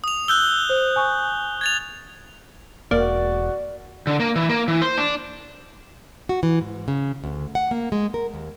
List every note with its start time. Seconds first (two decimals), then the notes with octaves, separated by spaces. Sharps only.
0.04 D#6 F7
0.28 E6 F#6 G6 G7
0.69 C5
0.96 G#5 C#6
1.61 G#6 A6 F7
2.91 E1 A#3 F#4 D5
4.07 D3
4.20 A#3
4.36 E3
4.49 A#3
4.68 E3
4.82 C5
4.98 D4
6.29 F#4
6.43 E3
6.61 G#2
6.88 C#3
7.24 D2
7.55 F#5
7.71 A#3
7.92 G#3
8.14 A#4
8.34 D#2